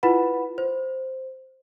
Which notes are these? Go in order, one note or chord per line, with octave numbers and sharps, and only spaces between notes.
E4 F4 B4 F#5 B5
C5